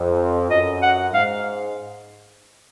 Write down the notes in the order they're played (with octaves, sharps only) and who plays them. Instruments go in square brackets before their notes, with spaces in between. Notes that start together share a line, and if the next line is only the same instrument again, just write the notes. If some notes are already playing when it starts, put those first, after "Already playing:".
Already playing: [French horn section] F2
[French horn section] F#2 [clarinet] D#5
[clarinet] F#5
[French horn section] G#2 [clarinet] F5